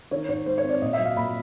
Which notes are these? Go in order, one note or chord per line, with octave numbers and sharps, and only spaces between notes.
D#3 C#5
G#2 C#5
G#3 C5
C#5
C4
D5
A#2 D#5
E5
F#3
F5
A#2 B5